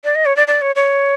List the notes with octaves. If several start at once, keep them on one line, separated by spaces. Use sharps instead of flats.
D5
D#5
C#5
D5
D5
C#5
C#5